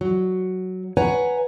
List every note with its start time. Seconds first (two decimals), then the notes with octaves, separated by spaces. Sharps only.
0.01 F#3
0.97 B4 C#5 F#5 G#5 A#5